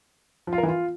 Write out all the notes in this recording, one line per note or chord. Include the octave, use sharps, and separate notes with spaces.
F3
F4
A#4
E3
F4